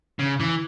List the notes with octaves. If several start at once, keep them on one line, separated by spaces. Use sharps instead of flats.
C#3
E3